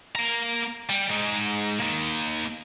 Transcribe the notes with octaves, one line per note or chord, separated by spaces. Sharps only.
A#3 A#5
G3
G#3 D#4
A#3 D#4